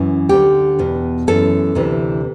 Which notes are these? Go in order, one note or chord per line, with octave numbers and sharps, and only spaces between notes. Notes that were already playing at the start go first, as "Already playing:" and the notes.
Already playing: F#2 E3
D2 D3 G4
E2 B2
F#2 E3 A4
D2 C3 E3